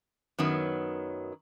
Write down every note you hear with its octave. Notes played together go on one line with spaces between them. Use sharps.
F#2 D#3 F#3 B3